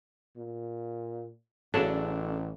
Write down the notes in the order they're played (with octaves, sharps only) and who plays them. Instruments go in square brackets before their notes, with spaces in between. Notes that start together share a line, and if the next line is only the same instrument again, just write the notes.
[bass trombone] A#2
[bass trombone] A1 [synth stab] C#3 F#3 D4 [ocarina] C#4 [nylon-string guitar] A4